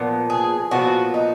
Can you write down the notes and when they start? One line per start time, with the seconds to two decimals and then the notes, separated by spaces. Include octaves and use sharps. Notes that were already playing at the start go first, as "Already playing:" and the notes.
Already playing: A#2 F3 B3
0.30 G#4
0.71 A#2 F3 B3 F#4
1.14 D#4